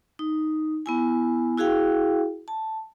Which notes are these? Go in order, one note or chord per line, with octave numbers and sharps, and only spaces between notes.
D#4
B3 E4 G#5
E4 F#4 G#4 F5 G5
A5